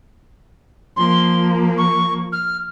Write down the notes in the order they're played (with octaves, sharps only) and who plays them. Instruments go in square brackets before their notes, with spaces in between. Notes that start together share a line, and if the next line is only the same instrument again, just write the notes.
[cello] F3 A#3 [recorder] C6
[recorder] C#6
F6